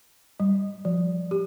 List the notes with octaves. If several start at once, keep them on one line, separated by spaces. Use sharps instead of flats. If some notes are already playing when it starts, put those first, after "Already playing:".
G3
F3
G4